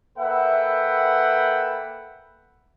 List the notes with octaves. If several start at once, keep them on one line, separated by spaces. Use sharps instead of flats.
A#3 A4 B4 E5 F#5 G5